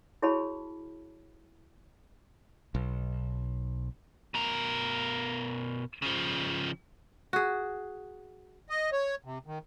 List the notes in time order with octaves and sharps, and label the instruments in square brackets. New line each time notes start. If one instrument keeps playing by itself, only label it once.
[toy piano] E4 F#4 G#4 C#5 A5 B5
[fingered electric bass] B1
[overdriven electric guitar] B2 A#4
C#3 F3
[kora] F#4 G#4
[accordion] D#5
C#5
C3
D#3